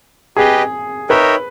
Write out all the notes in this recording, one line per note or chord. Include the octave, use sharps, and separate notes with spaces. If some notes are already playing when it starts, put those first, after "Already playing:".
G4 G#4 B4 D#5 G5
D#4 A#4 B4 C#5 E5 G5